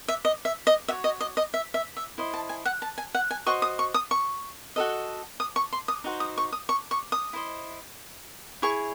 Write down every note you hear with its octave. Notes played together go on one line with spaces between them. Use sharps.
E5
D#5
E5
D#5
F#4 C#5 E5
D#5
D#5
D#5
E5
E5
E5
E4 C5 D#5
A5
G#5
F#5
A5
G#5
F#5
G#5
F#4 C5 D#5 C#6
D#6
C#6
D#6
C#6
F#4 A4 D#5
D#6
C#6
C6
D#6
D#4 F#4 C5
D#6
C#6
D#6
C#6
C#6
D#6
E4 C5 D#5
E4 G#4 C#5 C#6